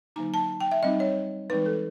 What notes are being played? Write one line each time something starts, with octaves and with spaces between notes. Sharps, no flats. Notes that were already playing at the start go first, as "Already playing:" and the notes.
D3 F#3 A#3 D#4 A#5
A5
G5
E5
G3 C4 D#4 D#5
C#5
E3 G#3 C4 D#4 B4
A4